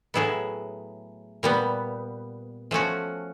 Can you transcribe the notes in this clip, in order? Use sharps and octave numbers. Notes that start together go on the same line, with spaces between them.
A2 F#3 B3 E4 G#4
A#2 G3 B3
F3 A3 C#4 F#4